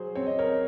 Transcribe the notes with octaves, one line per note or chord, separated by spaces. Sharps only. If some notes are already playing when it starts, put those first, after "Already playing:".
Already playing: F#3 G#4 C5
C4 C#5
D#5
A#4 C#5